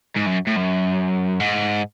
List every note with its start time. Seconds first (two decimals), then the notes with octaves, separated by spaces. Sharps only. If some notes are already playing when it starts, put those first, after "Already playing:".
0.16 G#2
0.26 F#2
0.47 A2
0.56 F#2
1.40 G#2